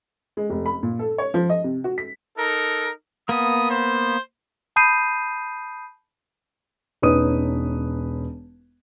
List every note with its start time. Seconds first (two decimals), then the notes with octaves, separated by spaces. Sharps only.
0.37 G#3
0.50 F1
0.66 B5
0.83 A#2
0.99 A4
1.18 C#5
1.34 F3
1.50 D#5
1.64 C3
1.84 F#4
1.98 B6
2.37 D#4 A4 A#4
3.29 A#3 B3 D#6
3.70 C5
4.76 A5 B5 D#6 G6 C7 D#7
7.02 E1 C#4 D#4 B4 D#6 D#7